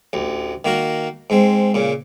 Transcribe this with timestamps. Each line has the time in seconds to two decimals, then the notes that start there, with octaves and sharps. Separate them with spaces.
0.13 A1 D2
0.65 D#3 A#3 F#4 A#4
1.30 G#2 G#3 C4
1.74 A#2 C#3